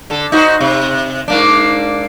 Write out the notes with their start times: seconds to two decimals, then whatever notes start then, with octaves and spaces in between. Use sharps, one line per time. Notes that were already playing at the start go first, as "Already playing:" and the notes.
0.10 D3 A4
0.32 D#4 F#4 C5
0.61 C3
1.28 G#2 A#3 D4